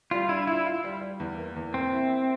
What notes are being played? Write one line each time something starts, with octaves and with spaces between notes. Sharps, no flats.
G3 F4
D4 E4
E4 F4
F4
G3
G3
E2
A#3
E2
A#3 C4
E4
E4